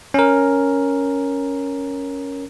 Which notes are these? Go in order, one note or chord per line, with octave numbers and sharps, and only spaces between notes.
C#4 A#4